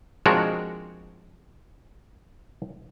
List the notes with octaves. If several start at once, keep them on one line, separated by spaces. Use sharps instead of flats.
F3 G#3 C4 D4 F#4 A#4